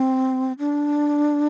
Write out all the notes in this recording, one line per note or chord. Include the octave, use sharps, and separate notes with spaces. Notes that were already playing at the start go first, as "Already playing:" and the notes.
Already playing: C4
D4